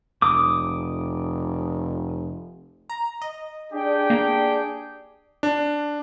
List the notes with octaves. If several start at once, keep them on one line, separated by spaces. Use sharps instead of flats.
F1 D6 D#6
A#5
D#5
D4 G4 G#4 G5
A#3
D4